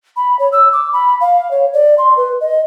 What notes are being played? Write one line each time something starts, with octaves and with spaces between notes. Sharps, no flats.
B5
C#5
E6
D6
B5
F5
C#5
D5
C6
B4
D#5